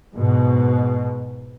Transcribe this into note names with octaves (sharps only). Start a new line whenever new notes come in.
G#2 B2